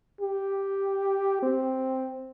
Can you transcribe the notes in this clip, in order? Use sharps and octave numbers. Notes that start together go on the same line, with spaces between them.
G4
C4